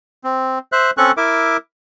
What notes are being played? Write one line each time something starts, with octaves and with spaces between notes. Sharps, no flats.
C4
C5 E5 F#6
C4 C#4 A4 C#6 F#6
E4 A#4 E5 D6